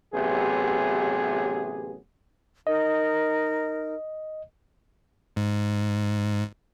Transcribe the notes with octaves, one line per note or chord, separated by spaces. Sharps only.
A1 C3 F#3 B3 G4 G#4
D#4 A#4 D#5
G#2